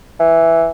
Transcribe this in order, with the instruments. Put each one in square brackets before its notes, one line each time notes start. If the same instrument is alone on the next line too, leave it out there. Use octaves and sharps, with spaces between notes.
[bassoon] E3